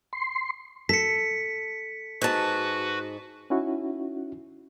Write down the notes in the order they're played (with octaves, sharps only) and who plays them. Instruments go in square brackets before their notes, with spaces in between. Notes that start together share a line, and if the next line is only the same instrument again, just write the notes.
[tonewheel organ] C6
[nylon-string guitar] A4 [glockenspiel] B6 C#7
[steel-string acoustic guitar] G#2 A5 [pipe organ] F#4 B4
[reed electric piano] C#4 D#4 E4 F#4